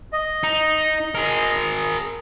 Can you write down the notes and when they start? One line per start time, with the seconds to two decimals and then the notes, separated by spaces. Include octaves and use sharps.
0.12 D#5
0.43 D#4
1.15 G#4 A#4